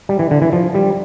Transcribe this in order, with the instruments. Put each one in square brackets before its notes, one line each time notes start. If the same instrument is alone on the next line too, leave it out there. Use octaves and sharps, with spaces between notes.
[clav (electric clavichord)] G3
E3
D3
E3
F3
G3